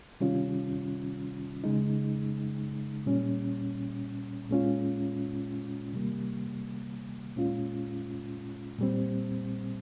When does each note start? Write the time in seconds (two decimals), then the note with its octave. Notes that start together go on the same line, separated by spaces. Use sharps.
0.21 C3 D#3 G3 C#4 F4
1.64 C#3 G#3 D#4
3.06 A#2 G3 C#4
4.50 A#2 G#3 C#4 F4
5.93 C3 D#3 G3 A#3
7.36 A#2 G#3 C#4 F4
8.79 A#2 G3 C4